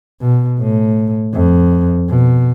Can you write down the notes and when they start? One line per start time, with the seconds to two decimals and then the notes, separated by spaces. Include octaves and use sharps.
0.22 B2
0.60 A2
1.34 F2
2.09 B2